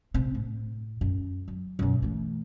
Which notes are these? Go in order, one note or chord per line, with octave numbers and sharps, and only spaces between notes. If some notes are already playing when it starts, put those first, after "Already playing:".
C3 C4
A2
F#2
F#3
F#2 B2
E3 A3